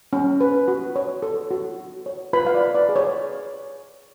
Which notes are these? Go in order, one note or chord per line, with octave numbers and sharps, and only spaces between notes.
C#4
B4
F#4
C#5
A4
F#4
F#4
C#5
F4 B4 B5
F5
D5
B4
D5
G#4
C#5